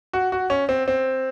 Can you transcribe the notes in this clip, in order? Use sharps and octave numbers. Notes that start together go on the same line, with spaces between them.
F#4
F#4
C#4
C4
C4